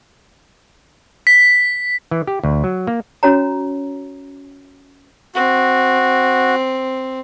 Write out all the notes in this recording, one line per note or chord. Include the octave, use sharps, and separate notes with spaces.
B6
E3
G4
D2
F#3
A#3
C#4 F#4 C#5 A#5
C4 F#4